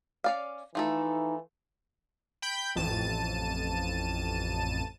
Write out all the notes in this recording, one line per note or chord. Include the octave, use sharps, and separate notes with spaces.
C#4 D5 F5
E3 F3 A3 D#4 A4
G5 B5 G6
A1 F2 A5 D#7